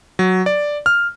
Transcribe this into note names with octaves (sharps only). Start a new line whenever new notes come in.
F#3
D5
F6